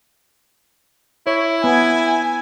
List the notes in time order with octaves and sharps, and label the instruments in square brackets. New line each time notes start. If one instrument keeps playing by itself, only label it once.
[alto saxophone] E4 [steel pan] C#5
[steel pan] B3 [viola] G#5